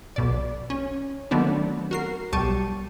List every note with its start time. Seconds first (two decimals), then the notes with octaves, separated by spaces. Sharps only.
0.16 B1 B2 D5
0.70 C#4
1.31 D#3 F#3 A3 B3 C4 D4
1.91 F#4 A#4 C7
2.33 B1 G3 G4 A5 C#6 D#7